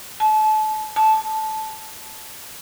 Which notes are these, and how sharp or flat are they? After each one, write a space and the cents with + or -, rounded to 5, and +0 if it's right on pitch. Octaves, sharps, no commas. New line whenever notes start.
A5 -30
A5 -10